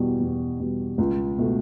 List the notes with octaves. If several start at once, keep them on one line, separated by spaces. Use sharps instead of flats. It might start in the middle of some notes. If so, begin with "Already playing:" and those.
Already playing: E2 B2 G3
E2
B2 G3
C#2
B2 A3